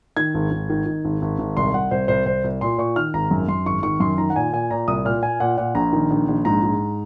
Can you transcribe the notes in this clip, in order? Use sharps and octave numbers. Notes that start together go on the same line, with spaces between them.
D#3 G#6
G#1
G#1
D#3
D#3
G#1
G#1
G#1
C2 C6
C2 F#5
C2 C5
C2 C5
C2 C5
C2
A#2 C6
A#2 C#6
D#3 F6
G#1 A#5
F#2
F#2 C6
G#1 C#6
D#3 C#6
F#2 C6
D#3 A#5
F#5
A#2 G#5
A#2 G#5
A#2 A#5
C2 D#6
A#2 F6
A#2 G#5
A#2 F#5
A#2 F#5
A#1 A#5
D#3
A#1
A#1
G#2 A#5
G#2